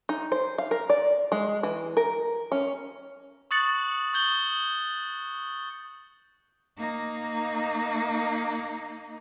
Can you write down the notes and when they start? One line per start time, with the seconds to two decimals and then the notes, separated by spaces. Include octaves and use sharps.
0.09 D#4
0.32 C5
0.58 F5
0.71 A#4
0.90 D5
1.32 G#3
1.63 E3
1.97 A#4
2.52 C#4
3.51 C#6 D#6 F#6 A6 C#7 F#7
4.13 C#6 D#6 G6 G7
6.78 A#3 D#4